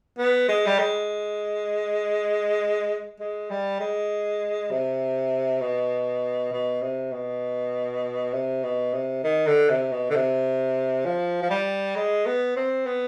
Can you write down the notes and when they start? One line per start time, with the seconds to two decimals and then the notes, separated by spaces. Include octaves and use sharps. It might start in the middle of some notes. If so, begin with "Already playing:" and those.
0.19 B3
0.48 G#3
0.67 G3
0.79 G#3
3.20 G#3
3.50 G3
3.80 G#3
4.71 C3
5.62 B2
6.52 B2
6.82 C3
7.13 B2
8.33 C3
8.64 B2
8.94 C3
9.24 D#3
9.47 D3
9.69 C3
9.92 B2
10.10 D3
10.15 C3
11.05 F3
11.43 F3
11.50 G3
11.96 G#3
12.26 B3
12.57 C4
12.86 B3